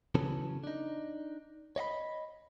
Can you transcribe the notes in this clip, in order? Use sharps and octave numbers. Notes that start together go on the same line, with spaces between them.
C#3 E3 F#3 B3 C#4 A4
D4 D#4
C#5 D#5 F5 B5